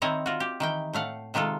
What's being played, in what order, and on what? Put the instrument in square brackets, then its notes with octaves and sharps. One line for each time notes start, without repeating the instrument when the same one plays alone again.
[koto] D#3 C4 E4 C#5 D#5 A#5
F4 F#4
G4
D#3 E3 G5
A2 A3 F5 F#5
C3 D#3 G#3 F4 A4